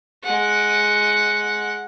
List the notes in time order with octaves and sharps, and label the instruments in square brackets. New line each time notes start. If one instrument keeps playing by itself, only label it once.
[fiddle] G#3 F#5